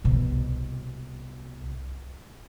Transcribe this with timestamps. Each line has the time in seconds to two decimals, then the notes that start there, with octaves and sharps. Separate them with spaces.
0.04 C2 B2